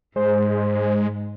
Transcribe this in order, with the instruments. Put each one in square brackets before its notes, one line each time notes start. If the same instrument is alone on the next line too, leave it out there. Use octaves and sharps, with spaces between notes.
[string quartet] G#2 [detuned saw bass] G#3 [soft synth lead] C5